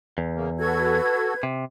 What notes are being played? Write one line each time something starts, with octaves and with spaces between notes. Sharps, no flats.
E2
C#3 A#3
F#4 A4 B4 G#6
C3